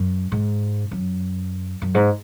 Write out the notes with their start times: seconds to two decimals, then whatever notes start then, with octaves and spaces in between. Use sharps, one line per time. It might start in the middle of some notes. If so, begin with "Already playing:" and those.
Already playing: F#2
0.32 G#2
0.91 F#2
1.82 F#2
1.94 G#2